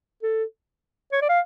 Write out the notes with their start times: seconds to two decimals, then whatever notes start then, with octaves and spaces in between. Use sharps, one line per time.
0.23 A4
1.12 C#5
1.22 D5
1.29 F5